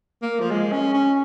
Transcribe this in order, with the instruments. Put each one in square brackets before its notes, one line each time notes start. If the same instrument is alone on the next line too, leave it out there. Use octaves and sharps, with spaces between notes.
[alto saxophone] A#3
F3
G#3
C#4
C#4